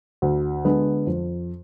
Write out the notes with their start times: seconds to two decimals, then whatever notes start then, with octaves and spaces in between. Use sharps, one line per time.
0.22 D2
0.65 D3 G#3 B3
1.07 F2